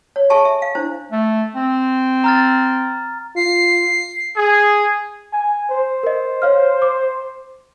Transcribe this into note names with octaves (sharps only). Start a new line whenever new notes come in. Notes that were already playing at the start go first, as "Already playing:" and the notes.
C#5
G#4 A4 E5 G#5 A5 C#6
E5
F5
D4 E4 C5
A3
C4
A#5 F6 A6
F4 C7
G#4
G#5
C5
A#4 D#5
C#5 F5 F6
D6